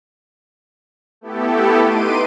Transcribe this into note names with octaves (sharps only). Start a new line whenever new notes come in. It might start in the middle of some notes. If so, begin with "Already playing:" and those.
A3 B3 E4 G4 A4
D#4 B4 C6 D6 D7 D#7